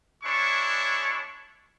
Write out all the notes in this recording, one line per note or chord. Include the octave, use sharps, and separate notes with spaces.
G#3 D4 E4 C#5 C#6